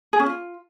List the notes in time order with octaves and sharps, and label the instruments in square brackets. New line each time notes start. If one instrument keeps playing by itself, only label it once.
[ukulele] G#4
C#4
F4